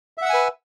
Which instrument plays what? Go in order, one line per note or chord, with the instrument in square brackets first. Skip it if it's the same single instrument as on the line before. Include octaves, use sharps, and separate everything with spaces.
[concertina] E5
F#5
E6
G#5
B4